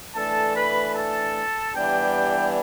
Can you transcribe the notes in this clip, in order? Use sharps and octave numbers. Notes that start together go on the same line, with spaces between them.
E3 A3 D4 A4 A5
B4 B5
A4 A5
E3 G3 B3 D4 G4 G5